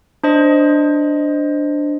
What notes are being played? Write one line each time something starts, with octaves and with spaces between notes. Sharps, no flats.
D4 C5 D#5